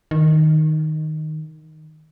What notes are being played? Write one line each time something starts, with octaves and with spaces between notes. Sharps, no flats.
D#3